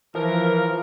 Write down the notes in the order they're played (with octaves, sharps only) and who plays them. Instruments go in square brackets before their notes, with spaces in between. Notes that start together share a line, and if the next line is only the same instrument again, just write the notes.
[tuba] E3 [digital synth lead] F3 [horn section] A#4